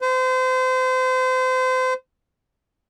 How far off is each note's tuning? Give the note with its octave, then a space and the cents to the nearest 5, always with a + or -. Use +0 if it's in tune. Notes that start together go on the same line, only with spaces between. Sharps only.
C5 -30